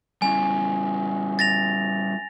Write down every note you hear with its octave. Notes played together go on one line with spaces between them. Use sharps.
G3 C#4 E4 G#5
A6 A#6 F7